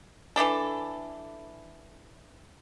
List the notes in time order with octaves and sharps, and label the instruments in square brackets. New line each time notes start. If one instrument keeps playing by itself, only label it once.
[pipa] E3 A3 D4 A4